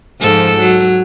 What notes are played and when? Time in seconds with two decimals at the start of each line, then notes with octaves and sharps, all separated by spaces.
0.20 G#2 F3 A4
0.60 F#3